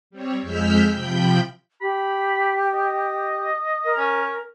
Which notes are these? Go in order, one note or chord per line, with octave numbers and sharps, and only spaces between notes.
G3 C4 C#5
F2 G#3 E6 F6 G6 B6
C3 F3 G5 B5 G6
G4 B5
D#5
A#4
C#4